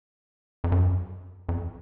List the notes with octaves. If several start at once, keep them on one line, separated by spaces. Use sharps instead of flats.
F2
F#2
F2